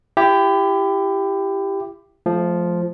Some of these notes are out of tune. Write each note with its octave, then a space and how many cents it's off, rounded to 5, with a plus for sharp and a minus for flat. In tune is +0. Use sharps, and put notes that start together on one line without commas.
E4 +30 G4 +5
F3 +0 A3 -35